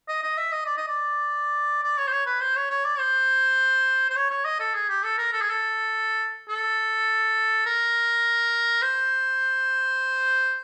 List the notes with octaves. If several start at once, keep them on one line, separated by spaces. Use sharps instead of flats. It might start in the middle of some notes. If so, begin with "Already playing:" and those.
D#5
D#5
E5
D#5
D5
D#5
D5
D5
C#5
C5
C#5
B4
C5
C#5
C#5
D5
C5
C5
C#5
C#5
D#5
A4
G#4
G4
A4
A#4
A4
G#4
A4
A4
A#4
C5